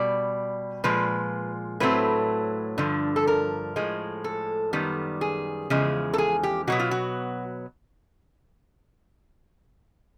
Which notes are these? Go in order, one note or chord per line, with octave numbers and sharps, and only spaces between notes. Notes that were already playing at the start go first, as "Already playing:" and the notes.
Already playing: B2 G3 D5
A#2 F3 G#3 B4
A2 F#3 A3 C4 B4
G2 D3 F3
A4
A#4
A2 F3 G#3
A4
F#2 D#3 G3 B3
G#4
E2 C#3 F3 G#3
A4
G#4
G4
B2 F#3 B3 F#4
F4
F#4